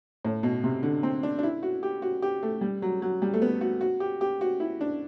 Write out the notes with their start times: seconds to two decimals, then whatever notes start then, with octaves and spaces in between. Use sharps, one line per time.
0.25 A2
0.43 B2
0.64 C3
0.83 D3
1.03 C4
1.23 D4
1.39 D4
1.43 E4
1.63 F#4
1.83 G4
2.02 F#4
2.22 G4
2.43 A3
2.61 G3
2.82 F#3
3.02 F#3
3.22 G3
3.34 A3
3.42 B3
3.61 F#4
3.81 F#4
4.00 G4
4.21 G4
4.41 F#4
4.60 E4
4.81 D4